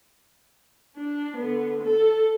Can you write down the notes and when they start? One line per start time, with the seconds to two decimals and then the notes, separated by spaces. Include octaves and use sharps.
0.97 D4
1.37 D3 B3
1.83 A4